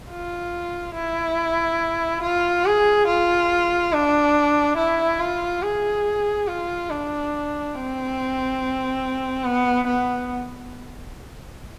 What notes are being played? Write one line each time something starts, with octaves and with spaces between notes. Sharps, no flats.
F4
E4
F4
G#4
F4
D4
E4
F4
G#4
F4
D4
C4
B3
B3